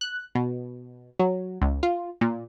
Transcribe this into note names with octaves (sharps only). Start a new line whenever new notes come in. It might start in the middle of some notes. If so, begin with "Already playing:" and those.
F#6
B2
F#3
C#2
F4
A#2